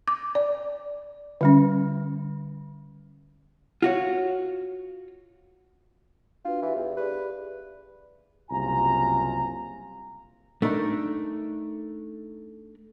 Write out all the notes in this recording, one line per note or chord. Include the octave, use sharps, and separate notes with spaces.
D6
D5
D3 G3 C#4
F4 F#4 C#5
D4 F4 F#4 B4
E3 G4 E5
E2
G4 G#4 B4 D5
F#1 C2 F4 G#5 A#5
A3 D4 D#4 A#4